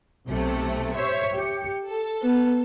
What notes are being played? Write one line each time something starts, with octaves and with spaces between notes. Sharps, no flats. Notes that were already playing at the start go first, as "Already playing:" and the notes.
B1 C3 A3
C5 C#5 E5
G4 C#7
A4
B3